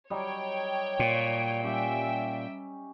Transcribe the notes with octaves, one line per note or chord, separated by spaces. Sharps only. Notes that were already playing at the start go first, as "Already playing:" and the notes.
F#3 G3 D#4 C#5 G5
A#2
G3 C#4 G4 E5 G5